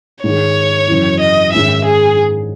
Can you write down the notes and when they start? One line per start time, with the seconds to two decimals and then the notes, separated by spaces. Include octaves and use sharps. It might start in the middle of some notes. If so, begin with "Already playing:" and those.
0.24 G#2 D#3 G#3 C#5
0.88 F#2 C#3 E3
1.20 D#5
1.52 G#2 D#3 G#3 C#4 E5
1.85 G#4